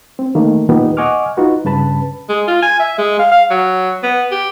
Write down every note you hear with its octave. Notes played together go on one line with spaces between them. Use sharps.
C4
D#3 A3 A#3
D#2 A#2 B3 D#4 G4
D#5 F#5 G#5 C#6 D6 F6
D#4 F4 F#4 B4
G2 C#3 B4 A5 B5
G#3
F4
G#5
E5
G#3
F5
F5
F#3
B3
G4